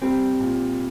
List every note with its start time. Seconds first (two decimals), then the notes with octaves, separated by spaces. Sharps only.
0.02 G3 C4
0.39 A#2